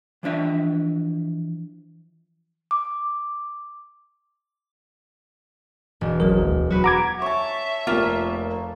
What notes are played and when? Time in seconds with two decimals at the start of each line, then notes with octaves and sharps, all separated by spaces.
0.23 E3 F3 D4 E5
2.71 D6
6.01 E1
6.20 G#1 F#3 A#4
6.41 D2
6.70 F#3 F#4 B4
6.84 F#5 A#5 D6 G#6
7.22 C#5 E5 A5
7.87 F1 A#3 F4